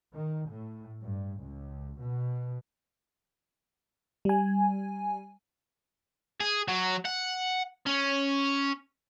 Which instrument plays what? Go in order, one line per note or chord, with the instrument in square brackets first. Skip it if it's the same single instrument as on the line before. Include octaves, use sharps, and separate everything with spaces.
[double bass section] D#3
A2
G2
C#2
B2
[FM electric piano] G3 G#5
[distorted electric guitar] G#4
F#3
F#5
C#4